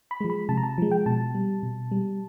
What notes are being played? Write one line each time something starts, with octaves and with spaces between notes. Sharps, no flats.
B5
F3 G#3
B5
C3 A5
A#5
A5
F3 G#3
G5
B2 A5
G3
B2
G3